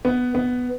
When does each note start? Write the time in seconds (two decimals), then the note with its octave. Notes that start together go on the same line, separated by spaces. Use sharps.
0.05 B3
0.35 B3